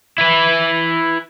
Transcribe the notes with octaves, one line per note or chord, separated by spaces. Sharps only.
E4 B4